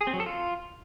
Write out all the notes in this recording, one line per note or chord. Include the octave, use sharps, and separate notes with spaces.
G#4
C4
F#3
A4
F4